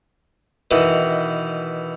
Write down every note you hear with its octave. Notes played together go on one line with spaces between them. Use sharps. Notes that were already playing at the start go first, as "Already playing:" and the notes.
B2 D#3 E3